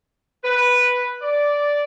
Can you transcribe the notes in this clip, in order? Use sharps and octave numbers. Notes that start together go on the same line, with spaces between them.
B4
D5